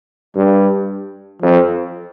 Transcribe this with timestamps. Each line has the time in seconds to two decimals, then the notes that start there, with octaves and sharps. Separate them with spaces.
0.35 G2 G3
1.42 F2 F3